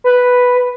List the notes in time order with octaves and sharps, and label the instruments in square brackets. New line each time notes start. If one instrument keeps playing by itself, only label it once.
[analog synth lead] B4